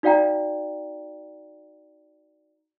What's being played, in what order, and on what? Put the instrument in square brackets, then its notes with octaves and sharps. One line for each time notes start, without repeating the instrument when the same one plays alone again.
[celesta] D#4 F#4 D5 F5 G5 A#5